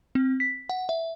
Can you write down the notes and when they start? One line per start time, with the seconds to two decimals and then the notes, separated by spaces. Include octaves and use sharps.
0.15 C4
0.40 B6
0.69 F#5
0.89 E5